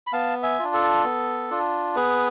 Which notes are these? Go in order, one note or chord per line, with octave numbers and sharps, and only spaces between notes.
B5
B3 F5 A5
E5 G#5
D4 F4
A4
B3
D4 F4
B3 G#4 B4